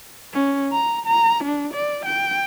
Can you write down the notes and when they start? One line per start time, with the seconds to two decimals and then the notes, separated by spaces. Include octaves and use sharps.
0.33 C#4
0.72 A#5
1.06 A#5
1.44 D4
1.74 D5
2.05 G5